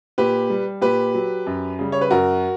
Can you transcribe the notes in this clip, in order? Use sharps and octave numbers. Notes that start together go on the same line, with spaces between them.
A#2 G4 B4
G3
A#2 G4 B4
F#3
F#2
C#3 G3
C#5
B4
F#2 F#4 A#4